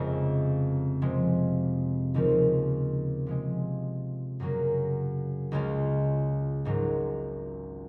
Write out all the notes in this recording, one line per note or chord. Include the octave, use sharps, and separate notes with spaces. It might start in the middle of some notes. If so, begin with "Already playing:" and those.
Already playing: F1 F2 C#3 G#3
C3 F3 G#3
D#2 C#3 F3 C4 F4
C3 F3 G#3
F#2 C#3 F#3 A#3
C#2 C#3 G#3 C#4 F4
G#1 G#2 F#3